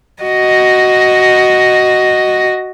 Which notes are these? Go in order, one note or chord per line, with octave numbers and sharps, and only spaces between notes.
F#4 D#5